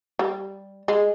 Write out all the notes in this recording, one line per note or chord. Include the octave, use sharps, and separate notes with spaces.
G3
G#3